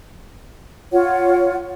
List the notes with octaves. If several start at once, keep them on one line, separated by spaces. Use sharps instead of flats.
F4 C#5 F#5